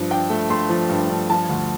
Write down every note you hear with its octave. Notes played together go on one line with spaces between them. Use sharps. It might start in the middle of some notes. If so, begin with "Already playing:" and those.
Already playing: G2 F3
D4 G5
A3
A3 C6
F3
G2
G2
F3 A5
D2